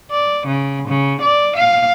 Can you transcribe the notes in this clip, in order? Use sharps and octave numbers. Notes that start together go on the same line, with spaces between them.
D5
C#3
C#3
D5
F5